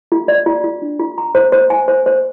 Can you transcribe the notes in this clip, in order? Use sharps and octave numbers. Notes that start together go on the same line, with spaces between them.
F4
D5
F4
F4
D4
F4
A#5
C5
C5
G#5
C5
C5